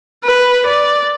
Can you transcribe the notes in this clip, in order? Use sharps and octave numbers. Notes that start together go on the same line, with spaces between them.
B4
D5